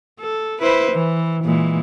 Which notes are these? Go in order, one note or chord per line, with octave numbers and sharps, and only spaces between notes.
A4
E4 B4 C5
E3
A#2 E3 G#3